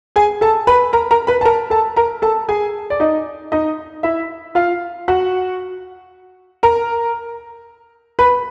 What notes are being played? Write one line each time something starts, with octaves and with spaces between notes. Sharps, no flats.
G#4 G#5
A4 A5
B4 B5
A#4 A#5
A#4 A#5
B4 B5
A5
A#4 A#5
A4 A5
A#4 A#5
A4 A5
G#4 G#5
D5
D#4 D#5
D#4 D#5
E4 E5
F4 F5
F#4 F#5
A#4 A#5
B4 B5